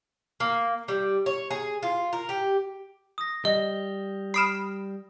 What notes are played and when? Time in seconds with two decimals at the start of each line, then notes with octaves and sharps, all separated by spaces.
0.40 A#3
0.88 G3
1.26 C#5
1.50 G#4
1.83 F4
2.13 A#4
2.29 G4
3.18 D#6 A#6
3.45 G3 D#5 G7
4.34 B5 D#6 F6 C7 D7 E7